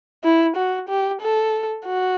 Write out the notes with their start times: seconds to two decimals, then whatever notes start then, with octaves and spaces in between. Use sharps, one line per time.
0.24 E4
0.56 F#4
0.89 G4
1.21 A4
1.86 F#4